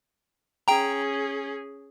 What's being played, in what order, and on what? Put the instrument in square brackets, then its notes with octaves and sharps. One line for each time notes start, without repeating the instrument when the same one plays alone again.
[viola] C#4 G#4 [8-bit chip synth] G5 A#5